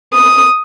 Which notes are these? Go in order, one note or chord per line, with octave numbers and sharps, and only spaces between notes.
D#6